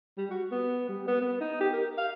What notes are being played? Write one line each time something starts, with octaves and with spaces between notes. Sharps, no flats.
G3
F#4
B3
G3
B3
B3
D#4
G4
A#4
F5